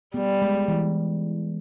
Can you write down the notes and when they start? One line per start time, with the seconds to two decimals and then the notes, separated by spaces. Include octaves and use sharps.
0.14 G3 B3
0.42 G#3
0.68 E3